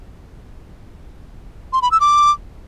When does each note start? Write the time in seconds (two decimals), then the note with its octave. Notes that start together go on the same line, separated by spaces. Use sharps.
1.73 C6
1.82 B5
1.91 E6
2.01 D6